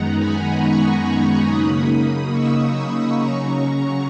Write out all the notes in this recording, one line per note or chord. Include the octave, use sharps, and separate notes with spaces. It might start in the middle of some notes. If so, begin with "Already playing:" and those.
Already playing: F#2 D#3 G#3 B3 D#4 F#5 A#5
G#5 B5
A#5 C#6
C#3 F#3 A#3 D#4 B5 D#6
B5 D#6
C#6 E6
B5 D#6
C#3 F#3 C#4 A#5 C#6